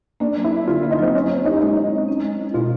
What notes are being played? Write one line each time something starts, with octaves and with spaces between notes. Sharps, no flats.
A#3 D4
F#3
E4
D4
D3 F4
A#3
D#4
F#3 C4
C#4 E4
C4
D#4 G4
G#3 D#4
E4
C4
C#4
G#3
E4
B2 F4